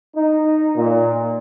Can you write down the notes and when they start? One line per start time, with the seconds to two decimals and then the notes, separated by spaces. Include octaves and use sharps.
0.15 D#4
0.76 A#2